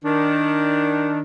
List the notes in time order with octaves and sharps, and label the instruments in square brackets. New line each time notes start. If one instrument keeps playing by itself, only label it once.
[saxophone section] D#3 D4